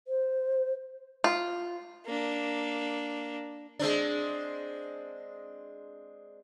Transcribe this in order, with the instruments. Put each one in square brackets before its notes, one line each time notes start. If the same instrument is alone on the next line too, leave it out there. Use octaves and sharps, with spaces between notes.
[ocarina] C5
[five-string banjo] F4
[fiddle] A#3 D4
[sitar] G#3 C4 D4